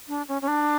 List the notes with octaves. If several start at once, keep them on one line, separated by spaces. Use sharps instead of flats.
D4
C#4
C#4
D4